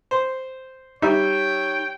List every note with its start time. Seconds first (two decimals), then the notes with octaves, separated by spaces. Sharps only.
0.11 C5
1.02 G3 D#4 C#5 E5 G5